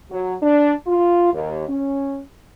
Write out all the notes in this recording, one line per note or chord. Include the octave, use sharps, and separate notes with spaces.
F#3
D4
F4
D#2
C#4